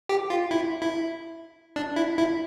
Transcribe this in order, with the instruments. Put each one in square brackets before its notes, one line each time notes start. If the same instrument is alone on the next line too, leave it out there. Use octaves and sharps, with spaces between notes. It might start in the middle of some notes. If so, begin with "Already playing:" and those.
[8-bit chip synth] G4
F4
E4
E4
D4
E4
E4